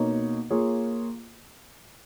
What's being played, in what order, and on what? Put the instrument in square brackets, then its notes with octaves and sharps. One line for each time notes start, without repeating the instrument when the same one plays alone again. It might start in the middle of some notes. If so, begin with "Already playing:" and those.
Already playing: [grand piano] B2 A#3 D#4 A#4 C#5
A#3 F4 G#4 C#5